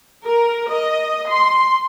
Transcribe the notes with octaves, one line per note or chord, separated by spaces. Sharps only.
A#4
D#5
C6